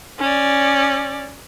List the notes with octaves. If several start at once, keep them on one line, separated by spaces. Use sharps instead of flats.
C#4 D5